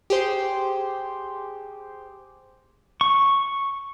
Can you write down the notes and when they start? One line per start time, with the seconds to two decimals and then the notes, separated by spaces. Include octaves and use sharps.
0.10 G4 G#4 C5 C6
3.01 C#6